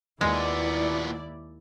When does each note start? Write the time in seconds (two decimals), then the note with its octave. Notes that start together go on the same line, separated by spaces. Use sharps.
0.21 D#2 A#2 G#3 B3 E4 D5